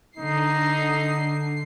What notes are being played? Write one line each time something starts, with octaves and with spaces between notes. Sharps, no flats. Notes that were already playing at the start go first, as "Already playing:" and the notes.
D3 D#4 C7